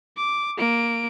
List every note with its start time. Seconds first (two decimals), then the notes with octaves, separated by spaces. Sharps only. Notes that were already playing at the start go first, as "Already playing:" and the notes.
0.17 D6
0.58 A#3 D7